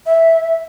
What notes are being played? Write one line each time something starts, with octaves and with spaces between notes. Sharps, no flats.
E5